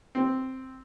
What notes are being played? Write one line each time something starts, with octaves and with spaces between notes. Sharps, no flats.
C4